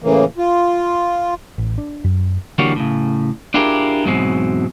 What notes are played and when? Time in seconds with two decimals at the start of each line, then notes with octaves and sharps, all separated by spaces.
0.02 A2 C#3 E3 A#3
0.38 F4
1.58 A1
1.78 D4
2.04 F#2
2.58 D3 E3 G3 A#3 F#4 C#5
2.76 A2 C#3
3.54 D4 E4 F4 G4 G#4 A#4
4.05 E2 G#2 B2 F#3 G#3 C4